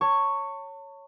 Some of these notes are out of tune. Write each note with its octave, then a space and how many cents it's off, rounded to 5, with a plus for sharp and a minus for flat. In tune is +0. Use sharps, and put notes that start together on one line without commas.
C#5 +0 A5 +40 C#6 +0